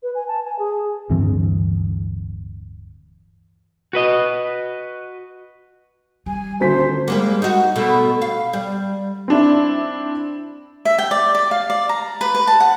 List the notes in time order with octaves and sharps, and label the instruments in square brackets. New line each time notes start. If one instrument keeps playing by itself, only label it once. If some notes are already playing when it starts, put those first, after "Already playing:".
[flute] B4
G#5
A5
G#5
G#4
[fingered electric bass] D1 G2 E3 C4
[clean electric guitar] F#4 B4 D#5
[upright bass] G3 [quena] G#5
[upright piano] D#1 D2 B6 [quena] C5
[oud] G3 G#3 A#3
D#4 F#4
B2 A3
F5
G3
[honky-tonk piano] C4 D4 E4
[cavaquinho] E5
G5
D5
D5
F5
D5
A#5
B4
B4
A5
F#5